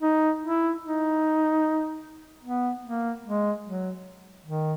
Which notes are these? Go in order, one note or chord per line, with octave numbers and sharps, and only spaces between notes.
D#4
E4
D#4
B3
A#3
G#3
F#3
D#3